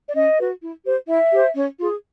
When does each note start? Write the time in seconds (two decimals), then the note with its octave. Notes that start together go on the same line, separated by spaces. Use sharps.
0.09 D5
0.14 C#4 D#5
0.38 F#4 B4
0.61 E4
0.85 G4 C5
1.08 E4 E5
1.31 G4 C5
1.55 C#4
1.78 F4 G#4